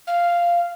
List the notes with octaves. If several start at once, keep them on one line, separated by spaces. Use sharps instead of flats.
F5